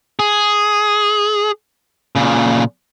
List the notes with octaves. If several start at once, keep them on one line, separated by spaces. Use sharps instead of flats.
G#4
A#2 C#3